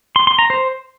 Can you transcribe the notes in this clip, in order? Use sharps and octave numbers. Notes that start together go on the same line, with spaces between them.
C6
C6
A#5
C5